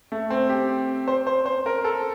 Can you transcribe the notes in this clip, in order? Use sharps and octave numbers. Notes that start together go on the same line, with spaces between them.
A3
C4
G4
C5
C5
C5
A#4
A4